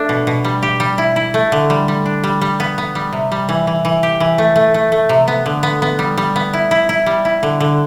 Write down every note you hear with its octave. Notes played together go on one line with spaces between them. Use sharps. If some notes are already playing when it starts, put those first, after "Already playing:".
Already playing: A3 D4
B2
B2
G3
G4
G3
E4
E4
A3
D3
G3
G3
D4
G3
G3
B3
B3
G3
C3
G3
E3
E3
E3
G4
E3
A3
A3
A3
A3
C3
B3
D3
B3
B3
G3
G3
B3
E4
E4
E4
G3
E4
D3
D3